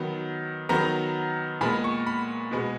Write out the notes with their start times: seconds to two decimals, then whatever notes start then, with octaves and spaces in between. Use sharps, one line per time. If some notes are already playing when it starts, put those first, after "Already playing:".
Already playing: D#3 F#3 B3
0.69 D#3 F#3 B3 A#5
1.61 A#2 G#3 B3 B5
1.84 C#6
2.07 B5
2.51 B2 G#3 B3